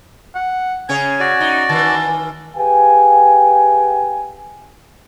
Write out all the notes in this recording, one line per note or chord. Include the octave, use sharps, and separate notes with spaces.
F#5
C#3 G#4 C#5 G#5
F#4 D5
D#4
D#3 E3 A5
G4 G#4 B4 F5 G5 G#5